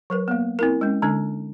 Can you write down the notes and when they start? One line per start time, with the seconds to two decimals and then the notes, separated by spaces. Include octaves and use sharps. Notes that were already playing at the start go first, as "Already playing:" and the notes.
0.10 F#3 A#4 B4
0.28 A#3 B3
0.59 C4 E4 A#4
0.81 G#3 C#4
1.02 D3 G#3 D4